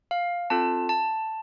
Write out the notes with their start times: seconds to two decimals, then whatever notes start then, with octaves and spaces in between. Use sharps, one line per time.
0.11 F5
0.50 C4 F4 A4 A5
0.89 A5